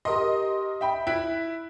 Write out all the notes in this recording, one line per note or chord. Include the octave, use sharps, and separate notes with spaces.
G4 A#4 D#5 C6
E5 G5 B5
E4 F#6 B6 D7